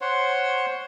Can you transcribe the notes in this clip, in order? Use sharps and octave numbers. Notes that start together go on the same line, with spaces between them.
C5 C#5 F#5 C6